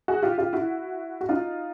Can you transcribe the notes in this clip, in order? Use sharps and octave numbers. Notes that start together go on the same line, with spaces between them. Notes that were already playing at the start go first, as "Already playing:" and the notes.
F#4 G#4
F4 G4
F4 G4
E4 F#4
F#4
D#4 F4